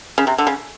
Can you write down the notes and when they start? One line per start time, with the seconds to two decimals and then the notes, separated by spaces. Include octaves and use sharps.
0.18 C#3
0.27 C3
0.38 D3
0.47 C#3